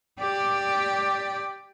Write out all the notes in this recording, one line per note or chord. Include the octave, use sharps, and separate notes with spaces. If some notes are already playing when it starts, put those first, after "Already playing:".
G4 D5